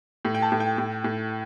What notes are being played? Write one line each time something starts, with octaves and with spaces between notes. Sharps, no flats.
A2
G5
A5
A2
G5
A2
A2